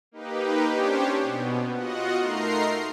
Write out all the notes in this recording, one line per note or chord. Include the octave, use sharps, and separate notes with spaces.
A#3 D#4 G4 B4
C#4 D4 G4 C5 C#5
B2 B3
F4 F#4 D#5 F#5
A3 D#4 A#4 A#5 C6 C7